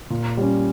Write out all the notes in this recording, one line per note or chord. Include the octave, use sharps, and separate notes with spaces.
A#2
G3 C#4